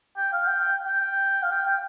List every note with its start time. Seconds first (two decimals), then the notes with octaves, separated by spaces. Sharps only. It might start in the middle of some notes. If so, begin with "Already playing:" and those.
0.17 G5
0.33 F5
0.47 G5
0.61 G5
0.87 G5
1.43 F5
1.52 G5
1.67 G5